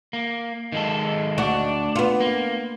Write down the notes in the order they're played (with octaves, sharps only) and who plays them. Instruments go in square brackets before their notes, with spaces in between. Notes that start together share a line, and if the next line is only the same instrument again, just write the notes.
[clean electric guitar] A#3
D#3 G#3 A4
[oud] D2 F#4 [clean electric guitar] D4
[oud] B3 F4
[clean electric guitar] A#3